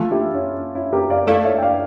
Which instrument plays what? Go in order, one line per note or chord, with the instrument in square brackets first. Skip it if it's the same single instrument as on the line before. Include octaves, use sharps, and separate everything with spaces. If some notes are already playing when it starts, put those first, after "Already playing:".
Already playing: [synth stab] E3 A3 [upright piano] F4 A4
[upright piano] E4 G4
C#4 E4
C#4 E4
G4 A#4
D5 F5
[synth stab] A3 E4 A4 [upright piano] D5 F5
[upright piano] C#5 E5
G5
D5 F5